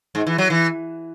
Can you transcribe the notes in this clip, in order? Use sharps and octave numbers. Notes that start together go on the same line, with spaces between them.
G#2
E3
F#3
E3